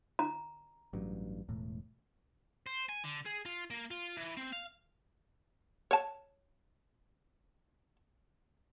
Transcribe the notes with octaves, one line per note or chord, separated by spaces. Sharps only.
A#5
A1 G2 F#3
E1 A2
C5
G#5
D3
G#4
F4
A#3
F4
E3
C4
F5
C#5 A5